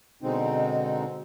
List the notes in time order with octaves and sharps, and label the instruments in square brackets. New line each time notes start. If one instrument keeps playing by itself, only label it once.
[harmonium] B2 D3 G#3 C4 D#4